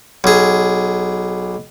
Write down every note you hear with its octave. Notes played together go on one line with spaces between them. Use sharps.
B1 G#4